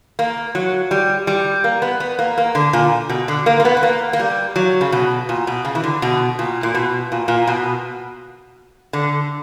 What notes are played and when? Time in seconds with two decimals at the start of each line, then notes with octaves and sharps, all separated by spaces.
0.19 A#3
0.55 F#3
0.91 G3
1.27 G3
1.64 A#3
1.82 B3
2.00 B3
2.19 A#3
2.38 A#3
2.55 D3
2.73 A#2
3.09 B2
3.28 D3
3.46 A#3
3.60 A#3
3.65 B3
3.77 B3
3.83 A#3
4.13 A#3
4.19 G3
4.56 F#3
4.81 C#3
4.92 B2
5.29 A#2
5.47 B2
5.65 C#3
5.75 E3
5.83 D3
6.02 B2
6.39 A#2
6.63 A#2
6.75 B2
7.12 A#2
7.28 A#2
7.47 B2
8.93 D3